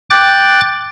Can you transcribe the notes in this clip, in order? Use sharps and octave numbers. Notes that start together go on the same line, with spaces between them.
G5 D6 F#6 A6